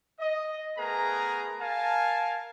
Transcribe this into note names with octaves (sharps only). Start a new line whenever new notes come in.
D#5
A3 B3 G#4 A#4 B4 A#5
A#4 F5 G#5 A5